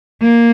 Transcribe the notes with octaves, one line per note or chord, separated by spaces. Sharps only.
A#3